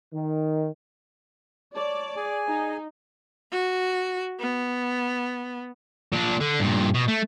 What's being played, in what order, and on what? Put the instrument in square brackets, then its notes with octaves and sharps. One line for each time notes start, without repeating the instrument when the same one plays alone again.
[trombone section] D#3
[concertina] C#5 A5 [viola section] D5
[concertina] G#4 G#5
[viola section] D#4
[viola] F#4
B3
[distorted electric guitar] A#2 D4
D3
G2 A#2
B2
A3